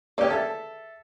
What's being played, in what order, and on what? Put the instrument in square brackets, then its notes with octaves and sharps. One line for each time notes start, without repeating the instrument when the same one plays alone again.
[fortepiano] A#3 C#4 G4 [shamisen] G#4 B4 D5
[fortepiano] A4 E5